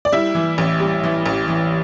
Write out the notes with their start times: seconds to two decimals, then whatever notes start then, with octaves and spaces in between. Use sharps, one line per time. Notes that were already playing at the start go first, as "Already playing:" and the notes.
0.05 D5
0.12 G3 E4 E5
0.35 E3
0.58 A1
0.80 G3
1.03 E3
1.26 A1
1.48 E3